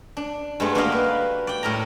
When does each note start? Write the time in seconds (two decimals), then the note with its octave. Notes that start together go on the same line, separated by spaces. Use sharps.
0.17 D4
0.60 G2 G#3 A3 B3
0.75 A#3 D4 F#4 G4 D#5 F5
0.92 B4
1.47 D5 G5
1.63 A2 A#4 E5 A#5